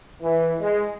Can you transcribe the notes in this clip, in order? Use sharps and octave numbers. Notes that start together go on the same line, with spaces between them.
E3
G#3